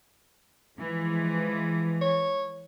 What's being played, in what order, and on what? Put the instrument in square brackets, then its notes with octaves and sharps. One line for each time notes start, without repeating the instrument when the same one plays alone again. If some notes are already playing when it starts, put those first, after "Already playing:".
[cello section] E3 F3 G#3
[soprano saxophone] C#5